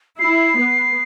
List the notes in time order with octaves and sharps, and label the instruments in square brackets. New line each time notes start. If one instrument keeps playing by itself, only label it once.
[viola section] E4 [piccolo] C7
[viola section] B3